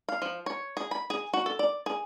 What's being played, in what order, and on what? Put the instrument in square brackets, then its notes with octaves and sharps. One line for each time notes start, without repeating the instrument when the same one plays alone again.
[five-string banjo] F5
F3
C#5
G#4
B5
G#4
F#4
A4
D5
G#4